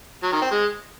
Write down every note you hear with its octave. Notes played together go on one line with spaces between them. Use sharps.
F#3
D#3
C4
G#3